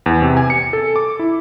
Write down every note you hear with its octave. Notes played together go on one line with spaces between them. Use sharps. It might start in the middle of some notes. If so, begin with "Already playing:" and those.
E2
C3
G#5
C#7
A4
D6
E4